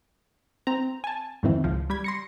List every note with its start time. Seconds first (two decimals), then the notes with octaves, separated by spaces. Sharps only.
0.67 C4 A#5
1.04 G#5 A5
1.43 F2 G#2 D#3 E3 C4 E4
1.64 C#2 F3
1.90 G3 B5 G#6
2.04 C6 A#6 C#7